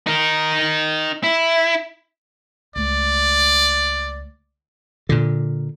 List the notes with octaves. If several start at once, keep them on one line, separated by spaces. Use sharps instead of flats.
D#4 A#4
E4
C#2 A3 D5
A#2 D3